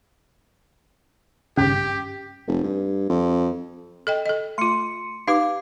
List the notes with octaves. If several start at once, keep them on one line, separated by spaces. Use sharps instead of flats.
G#1 G2 C#3 C#4 G4
F1
G2
F2
A4 D#5 G5
A4 D#5
A3 F4 C6 C#7
D#4 G4 B4 F5 D6